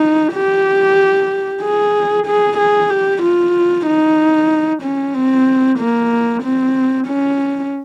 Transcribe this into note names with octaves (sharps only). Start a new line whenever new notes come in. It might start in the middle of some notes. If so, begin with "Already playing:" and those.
Already playing: D#4
G4
G#4
G#4
G#4
G4
F4
D#4
C#4
C4
A#3
C4
C#4